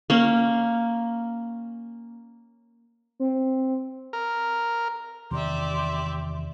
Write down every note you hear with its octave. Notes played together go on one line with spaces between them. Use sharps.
A#3 C#4
C4
A#4
E2 C3 D#3 G4 D5 E5 C6